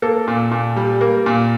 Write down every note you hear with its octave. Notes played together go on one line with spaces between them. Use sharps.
A#3 A4
A#2
A#2
G3
A#3
A#2